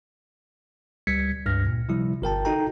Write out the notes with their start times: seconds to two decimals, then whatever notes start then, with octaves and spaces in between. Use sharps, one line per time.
1.07 C#2 G3 G#6 B6 C#7
1.45 C#2 G2 F6 A#6
1.67 A#2
1.89 C3 F3 G3 E4
2.22 G1 A#4 G5 A5
2.45 D#4 F#4 A4 G5 A#5